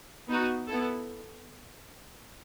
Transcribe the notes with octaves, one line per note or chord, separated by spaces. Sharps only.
B3 D#4 F#4
B3 E4 A4